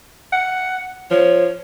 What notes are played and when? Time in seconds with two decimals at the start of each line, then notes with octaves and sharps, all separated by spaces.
0.32 F#5
1.10 F3 C#5